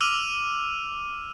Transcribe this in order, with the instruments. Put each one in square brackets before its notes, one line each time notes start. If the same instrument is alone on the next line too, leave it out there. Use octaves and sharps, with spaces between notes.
[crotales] D6 E6 F6 D#7 F7